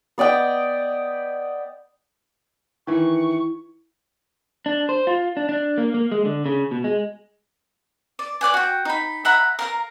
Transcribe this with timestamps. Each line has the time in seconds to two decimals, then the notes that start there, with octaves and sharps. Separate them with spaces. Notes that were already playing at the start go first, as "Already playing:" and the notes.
0.18 B3 D5 D#5 G5
2.87 D#3 E3 E4 C#6
4.66 D4
4.89 C5
5.07 F4
5.37 D4
5.49 D4
5.78 A#3
5.94 A#3
6.12 G#3
6.25 D3
6.46 C#3
6.71 B2
6.84 G#3
8.19 D5
8.41 C#5 D5 F#5 G#5
8.54 F#4 G5
8.85 D#4 B5
9.25 E5 F#5 A#5 B5
9.59 A#4 F5 A#5